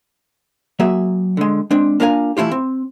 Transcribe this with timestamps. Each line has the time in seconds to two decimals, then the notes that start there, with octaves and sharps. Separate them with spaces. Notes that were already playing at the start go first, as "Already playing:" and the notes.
0.79 F#3 A#3 G#4 E5
1.37 D3 G#3
1.71 G#3 C4 D4
2.00 A#3 D4 F4 A#4 F5 G#5
2.37 E3 A3 E4 F4 G4
2.51 C4